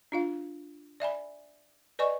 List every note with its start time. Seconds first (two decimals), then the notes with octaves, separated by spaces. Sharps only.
0.12 D4 F4 F5
1.00 D5 E5 G#5 B5
1.99 B4 D5 D#5 G#5 C#6